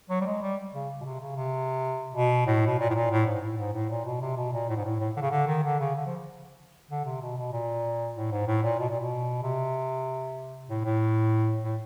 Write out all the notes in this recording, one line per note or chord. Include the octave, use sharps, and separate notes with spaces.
F#3
G3
G#3
G3
C#3
B2
C3
C#3
C3
B2
A2
B2
A#2
A2
A#2
A2
G#2
A2
G#2
A2
A#2
B2
C3
B2
A#2
A2
G#2
A2
A2
D3
C#3
D3
D#3
D3
C#3
D3
F3
D3
C3
B2
B2
A#2
A2
G#2
A2
A#2
B2
A#2
B2
C3
A2
A2
A2